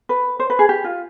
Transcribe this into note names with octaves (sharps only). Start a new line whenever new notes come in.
B4
C5
B4
G#4
G4
F4